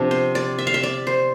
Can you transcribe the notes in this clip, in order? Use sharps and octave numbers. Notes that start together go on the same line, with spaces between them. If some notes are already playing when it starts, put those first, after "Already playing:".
Already playing: C3 F3 B3 D4
C5
D5
E5
F5
E5
D5
C5